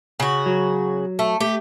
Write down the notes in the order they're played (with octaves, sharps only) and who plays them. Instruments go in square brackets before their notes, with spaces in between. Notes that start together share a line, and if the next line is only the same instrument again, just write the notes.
[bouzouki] C#3 F#4
[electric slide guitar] F#3
[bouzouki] A3
[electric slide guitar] A3 [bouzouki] G4